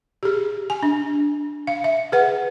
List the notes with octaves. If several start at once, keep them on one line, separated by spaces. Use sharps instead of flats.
G4 G#4
G#5
D4
F5
E5
G#4 B4 F#5